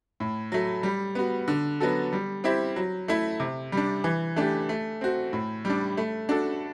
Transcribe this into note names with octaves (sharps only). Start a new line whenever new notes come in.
A2
F#3 A3
G3
B3 F#4
D3
F#3 B3 F#4 A4
G3
C4 E4 G4
F#3
A3 E4
C3
G3 D4
E3
A3 D4 G4
A3
C4 F#4
A2
G3 D4
A3
D4 F#4 A4